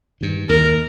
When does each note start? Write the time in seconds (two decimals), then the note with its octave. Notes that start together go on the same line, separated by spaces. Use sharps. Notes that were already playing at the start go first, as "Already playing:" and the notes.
0.21 G2 D#3
0.49 D#2 A#4